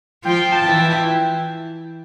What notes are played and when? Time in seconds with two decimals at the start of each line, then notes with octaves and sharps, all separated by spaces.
0.25 F3 F4 G5
0.52 A5
0.66 E3 E4
0.79 G5